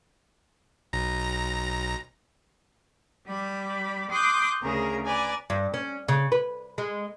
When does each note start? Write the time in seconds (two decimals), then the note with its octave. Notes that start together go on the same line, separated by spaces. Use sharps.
0.93 B1 A#5 A#6
3.27 G3 B5 D6
4.10 C6 D6 D#6 F#6 G6
4.62 D2 C#3 G#4 A#4 A#5
5.05 B4 D5 G#5 A#5
5.50 G2
5.74 C#4
6.08 C#3
6.32 B4
6.78 G#3